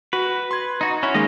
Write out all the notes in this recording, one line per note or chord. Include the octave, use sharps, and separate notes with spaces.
F#4 B4
C6 G#6
D#4 F#4
C#4 E4 F#4
D#3 G#3 A#3 F4 G4 D#5